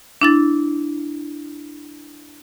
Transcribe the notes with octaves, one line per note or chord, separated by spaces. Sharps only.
D4 E4 A6